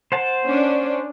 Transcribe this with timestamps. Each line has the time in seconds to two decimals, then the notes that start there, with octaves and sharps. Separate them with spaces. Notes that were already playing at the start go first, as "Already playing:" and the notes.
0.12 C5 F#5 A5
0.46 C#4 D4